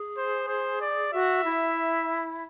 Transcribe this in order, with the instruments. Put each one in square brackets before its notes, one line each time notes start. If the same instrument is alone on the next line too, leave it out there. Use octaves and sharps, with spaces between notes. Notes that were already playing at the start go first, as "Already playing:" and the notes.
Already playing: [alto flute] G#4
[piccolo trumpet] C5
C5
D5
[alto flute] F#4 [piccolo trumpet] E5
[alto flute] E4